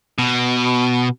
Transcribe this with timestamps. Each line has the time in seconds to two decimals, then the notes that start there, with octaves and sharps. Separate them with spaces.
0.19 B2